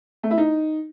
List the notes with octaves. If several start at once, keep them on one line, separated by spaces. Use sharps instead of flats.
A3
E4
D#4